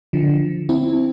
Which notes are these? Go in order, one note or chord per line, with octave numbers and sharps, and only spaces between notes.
D3 F3
C4 E4